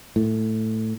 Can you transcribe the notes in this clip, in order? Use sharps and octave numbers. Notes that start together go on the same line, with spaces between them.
A2